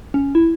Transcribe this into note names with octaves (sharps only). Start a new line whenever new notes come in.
C#4
E4